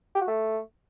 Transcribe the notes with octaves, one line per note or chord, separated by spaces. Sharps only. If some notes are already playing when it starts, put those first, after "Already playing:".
G4
F#4
A3